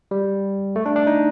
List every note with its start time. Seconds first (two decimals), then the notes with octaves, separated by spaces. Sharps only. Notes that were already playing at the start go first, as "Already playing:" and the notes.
0.11 G3
0.76 A3
0.86 D4
0.96 D4
1.07 D#4